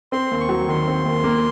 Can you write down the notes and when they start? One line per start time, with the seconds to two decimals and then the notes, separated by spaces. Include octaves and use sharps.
0.12 C4 C6
0.31 D#2
0.40 C#6
0.49 F#3
0.69 D#3 C6
0.88 C4
1.05 D#2
1.24 A#3